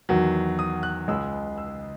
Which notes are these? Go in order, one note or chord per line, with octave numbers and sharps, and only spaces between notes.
E2 D#3 F#3
D#6
F#6
C#2 C#3 G#3 E6
E6